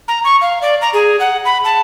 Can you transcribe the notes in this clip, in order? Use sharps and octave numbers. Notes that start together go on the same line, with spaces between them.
A#5
C#6
F5
D5
A#5
G#4
F#5
B5
A5